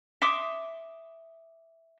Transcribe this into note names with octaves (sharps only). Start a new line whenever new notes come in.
E5 C6 D6 D#6